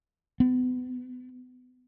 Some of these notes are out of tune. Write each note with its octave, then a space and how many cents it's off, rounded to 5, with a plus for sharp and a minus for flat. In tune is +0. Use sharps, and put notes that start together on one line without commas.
B3 +30